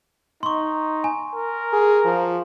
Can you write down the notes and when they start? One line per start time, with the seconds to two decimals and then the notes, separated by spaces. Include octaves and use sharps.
0.43 D#4 C6 C#6
1.04 G#5
1.35 A#4
1.73 G#4
2.05 F3